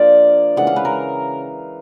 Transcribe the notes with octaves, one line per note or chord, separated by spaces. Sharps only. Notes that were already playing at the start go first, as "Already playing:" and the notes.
Already playing: F3 A#3 D4 D5
C#3 E3 G#3 F#5
F5
B4
A#4